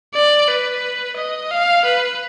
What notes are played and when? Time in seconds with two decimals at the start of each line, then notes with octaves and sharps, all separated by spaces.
0.14 D5
0.48 B4
1.16 D#5
1.51 F5
1.85 B4